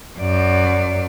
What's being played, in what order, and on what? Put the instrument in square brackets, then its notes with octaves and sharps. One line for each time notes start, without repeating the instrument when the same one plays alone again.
[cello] F#2 D5